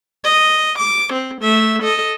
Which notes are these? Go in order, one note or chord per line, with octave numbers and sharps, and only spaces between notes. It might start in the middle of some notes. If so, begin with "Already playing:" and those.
D#5
D6
C4
A3 E5
A4 D#5